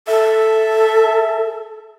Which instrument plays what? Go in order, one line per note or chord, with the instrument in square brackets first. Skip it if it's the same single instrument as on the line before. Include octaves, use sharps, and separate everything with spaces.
[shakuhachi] A4 [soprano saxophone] E5